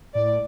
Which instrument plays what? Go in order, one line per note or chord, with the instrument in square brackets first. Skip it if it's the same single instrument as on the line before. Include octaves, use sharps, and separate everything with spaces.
[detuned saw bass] A2 [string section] D5